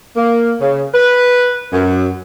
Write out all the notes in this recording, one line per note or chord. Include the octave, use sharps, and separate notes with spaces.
A#3
C#3
B4
F#2